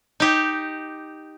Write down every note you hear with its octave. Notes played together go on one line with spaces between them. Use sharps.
D#4 G4